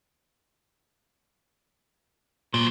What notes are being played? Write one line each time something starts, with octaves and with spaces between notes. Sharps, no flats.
A#2 F#3 C5